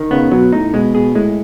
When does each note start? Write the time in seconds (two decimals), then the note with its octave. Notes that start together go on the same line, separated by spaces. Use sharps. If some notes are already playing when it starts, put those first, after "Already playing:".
Already playing: D#3
0.11 C#3 B3
0.32 B2 F#3
0.52 A2 D#4
0.74 B2 G#3
0.95 B2 G#4
1.15 A2 G#3